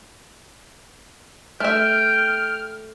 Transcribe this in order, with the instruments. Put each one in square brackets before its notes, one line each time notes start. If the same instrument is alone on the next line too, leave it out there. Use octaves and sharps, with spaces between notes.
[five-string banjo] A3 E5 [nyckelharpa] G5 [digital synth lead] F6